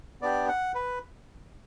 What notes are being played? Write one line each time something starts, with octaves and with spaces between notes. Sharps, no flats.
B3 D4 G4 D5
F#5
B4